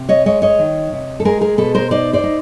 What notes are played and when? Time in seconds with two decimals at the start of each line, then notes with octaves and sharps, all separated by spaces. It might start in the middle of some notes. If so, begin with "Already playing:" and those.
Already playing: C3
0.09 C#5 D#5
0.26 G#3 C#5 D#5
0.42 C#5 D#5
0.59 D#3
0.93 C3
1.20 A4
1.25 G#3 G#4 A#4
1.41 G#4 A#4
1.58 B2 A4 B4
1.75 A#4 C5
1.91 D#4 C5 D5
2.13 C5 D5
2.24 D#4